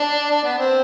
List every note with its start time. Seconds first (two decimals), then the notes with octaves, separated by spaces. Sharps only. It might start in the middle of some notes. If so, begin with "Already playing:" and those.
Already playing: D4
0.31 D4
0.44 B3
0.58 C4